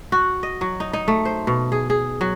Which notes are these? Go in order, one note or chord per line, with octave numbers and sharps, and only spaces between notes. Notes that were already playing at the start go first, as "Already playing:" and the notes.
F#4
D#5
F#3
D#4
D#4
A3
C5
B2
G#4
G#4
F#3